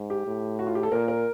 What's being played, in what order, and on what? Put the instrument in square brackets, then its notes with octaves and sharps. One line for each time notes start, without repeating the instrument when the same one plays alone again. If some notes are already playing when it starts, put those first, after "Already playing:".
Already playing: [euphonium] G#2
[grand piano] G4
[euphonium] A2
[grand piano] F#4
F4
G4
A4
[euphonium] A#2 [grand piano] A#4
[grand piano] A#4